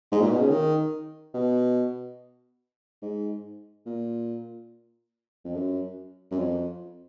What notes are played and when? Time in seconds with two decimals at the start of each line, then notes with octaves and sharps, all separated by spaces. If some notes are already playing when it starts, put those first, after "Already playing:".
0.12 G#2
0.22 A#2
0.31 B2
0.40 C#3
0.50 D#3
1.34 B2
3.02 G#2
3.86 A#2
5.45 F2
5.55 F#2
6.31 F#2
6.39 F2